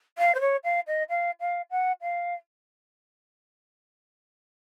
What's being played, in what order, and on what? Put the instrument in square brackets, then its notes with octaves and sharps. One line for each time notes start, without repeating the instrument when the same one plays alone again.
[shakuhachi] F5
C5
C#5
F5
D#5
F5
F5
F#5
F5